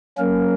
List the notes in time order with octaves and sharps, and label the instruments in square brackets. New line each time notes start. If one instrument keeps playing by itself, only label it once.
[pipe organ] F#3 A#3 C#4 A#4